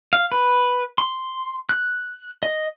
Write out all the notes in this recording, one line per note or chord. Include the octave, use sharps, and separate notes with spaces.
F5
B4
C6
F#6
D#5